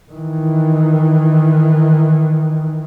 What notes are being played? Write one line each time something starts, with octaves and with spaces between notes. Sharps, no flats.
D#3 E3